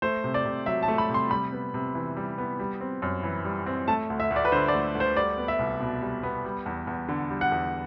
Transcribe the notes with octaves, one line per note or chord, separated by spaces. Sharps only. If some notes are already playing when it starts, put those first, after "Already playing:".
A3 C5
C3
D5
C3
F#3 E5
A5
A3
B5
C3
C6
G3 B5
B3
C3
E3
G3
B3
G3
C4
F#2
E3
G3
C4
A3 A5
D2
E5
D2
D5
B4
D3 C5
D5
A3
D2
C5
G3 D5
B3
E5
C2
B2
G3
B3
G3
E2
E2
D3
G3
F#5
E2